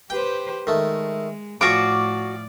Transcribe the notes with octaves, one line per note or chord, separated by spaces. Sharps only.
G4 B4 C5 G5
D#3 G#3 A3
A2 F3 F4 F#4 C#5 D5 D6